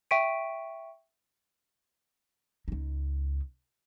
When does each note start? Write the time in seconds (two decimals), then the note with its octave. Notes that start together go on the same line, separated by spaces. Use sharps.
0.11 E5 G5 C#6 B6 D7 D#7
2.68 C#2 D#4